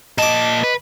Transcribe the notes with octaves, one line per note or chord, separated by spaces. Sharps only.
A#2 D#5 A5 D6
B4